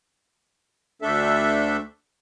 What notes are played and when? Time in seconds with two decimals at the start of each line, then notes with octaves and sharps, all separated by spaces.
1.02 D2 A3 D4 A4 E5